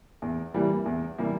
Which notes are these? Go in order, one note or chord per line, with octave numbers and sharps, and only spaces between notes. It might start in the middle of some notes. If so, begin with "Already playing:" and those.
E2
C3 E3 G3 A#3
E2
C3 E3 G3 A#3